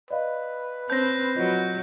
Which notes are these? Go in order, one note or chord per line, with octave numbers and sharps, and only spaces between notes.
B4 D5 D#5 F5
C4 C5 C#5 A5 G6 A#6
F#3 F4 D#5